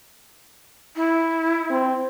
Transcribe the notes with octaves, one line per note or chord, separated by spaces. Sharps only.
E4
C4